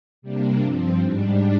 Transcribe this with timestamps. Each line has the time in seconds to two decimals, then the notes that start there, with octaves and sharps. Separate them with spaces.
0.22 C3 G3 A#3 D4
0.60 G2 F3 C4
0.96 G#2 G3 D4